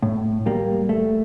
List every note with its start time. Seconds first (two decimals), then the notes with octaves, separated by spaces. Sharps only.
0.02 A2
0.46 G3 A#3
0.89 A3